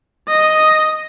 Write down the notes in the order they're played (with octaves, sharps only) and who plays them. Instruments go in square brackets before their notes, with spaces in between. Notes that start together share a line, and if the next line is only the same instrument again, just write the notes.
[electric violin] D#5